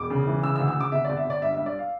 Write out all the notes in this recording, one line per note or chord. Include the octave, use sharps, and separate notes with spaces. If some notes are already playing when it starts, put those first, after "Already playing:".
Already playing: E1 D6
C#3
E3
C#3 E6
E6
D2
E6
C#3
D6
G1 E5
D5
G1
E5
G1 D5
G2 E5
G2 E5
D5
F5